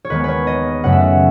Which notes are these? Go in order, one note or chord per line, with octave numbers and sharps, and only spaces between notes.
C#5
D#2 D#3 G#3 B3 B4
B4 C#5
D#5
F#2 C#3 F#3 A3 F#5
E5
F#5